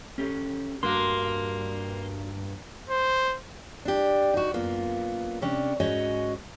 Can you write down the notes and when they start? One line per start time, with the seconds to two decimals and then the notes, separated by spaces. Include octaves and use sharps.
0.18 C#4 G4 A4
0.83 G2 A#3 D4 F#4 C6
2.90 C5
3.85 D4 G4
4.34 D#4 F#4
4.54 F#2 A#3 B3 F4
5.42 C3 C#4 D4
5.80 G#2 C#4 F#4 C#5 D#5